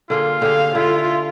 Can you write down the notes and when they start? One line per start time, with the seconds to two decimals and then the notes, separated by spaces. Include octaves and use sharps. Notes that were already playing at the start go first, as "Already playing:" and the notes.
0.10 D3 A#3 F4 G#4
0.42 D3 G4 G#4 F5
0.75 D3 E4 F4